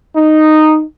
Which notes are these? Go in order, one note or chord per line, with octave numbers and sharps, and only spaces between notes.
D#4